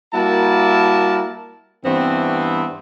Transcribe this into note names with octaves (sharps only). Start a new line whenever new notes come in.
G3 A#3 E4 F#4 A#4 A5
G2 E3 B3 C4